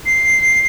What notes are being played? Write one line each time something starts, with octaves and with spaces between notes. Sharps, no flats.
C7